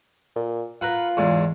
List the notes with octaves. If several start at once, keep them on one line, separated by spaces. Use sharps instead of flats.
A#2
F4 A#4 B4 F#5
E2 G#2